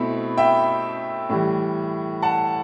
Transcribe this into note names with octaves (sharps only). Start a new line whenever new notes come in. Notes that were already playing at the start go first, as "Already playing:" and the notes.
Already playing: B2 A3 C4 E4 B5
E5 G5
A2 E3 G3
F#5 A5